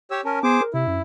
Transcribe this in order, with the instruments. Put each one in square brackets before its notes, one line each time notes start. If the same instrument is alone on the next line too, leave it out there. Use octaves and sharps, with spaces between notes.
[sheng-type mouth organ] G4 C#5 E6
[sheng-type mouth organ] C#4 A#4 [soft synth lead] A5
[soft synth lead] B3 [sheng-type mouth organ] G#4 C5 D6
[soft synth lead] A#4
[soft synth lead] C3 [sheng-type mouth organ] E4
[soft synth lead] F#2